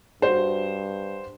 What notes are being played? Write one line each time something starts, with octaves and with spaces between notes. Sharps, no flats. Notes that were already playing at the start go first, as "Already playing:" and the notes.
G2 F#4 C5